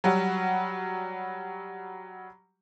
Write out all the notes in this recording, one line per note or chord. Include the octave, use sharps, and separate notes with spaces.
F#3 G3 F#4